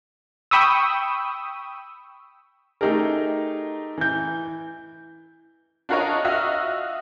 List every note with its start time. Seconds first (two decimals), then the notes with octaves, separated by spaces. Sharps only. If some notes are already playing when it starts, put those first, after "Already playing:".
0.51 G5 B5 C#6 D#6 E6
2.81 A3 D#4 G4 G#4 A#4
3.98 E3 G6
5.89 D4 F4 F#4 A#4 C#5 D#5
6.24 F4 F#4 D#5 E5 F6